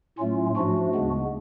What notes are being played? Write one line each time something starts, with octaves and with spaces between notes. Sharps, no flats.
A2 F#3 A3 C#4 F4
G#2 F3 A3 D4 F#4
D2 C#3 G#3 B3